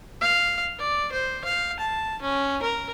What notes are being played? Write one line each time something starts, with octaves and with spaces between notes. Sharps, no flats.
F5
D5
C5
F5
A5
C#4
A#4